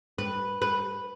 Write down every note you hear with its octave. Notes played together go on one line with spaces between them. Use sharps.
B4
B4